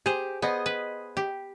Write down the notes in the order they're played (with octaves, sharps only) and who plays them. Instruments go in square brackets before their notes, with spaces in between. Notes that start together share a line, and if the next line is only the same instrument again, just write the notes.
[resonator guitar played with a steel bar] G4 [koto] G#4 C5
[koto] B3 [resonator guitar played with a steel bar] G#4 C5 D#5
[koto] B4
G4